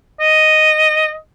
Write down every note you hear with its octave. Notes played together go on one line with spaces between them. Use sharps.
D#5